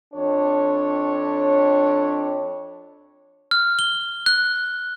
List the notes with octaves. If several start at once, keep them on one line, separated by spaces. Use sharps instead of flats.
F2 D4 C#5
F6
G7
F#6